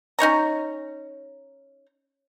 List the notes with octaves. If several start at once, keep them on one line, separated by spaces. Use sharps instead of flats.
C#4 D#4 C#5 A#5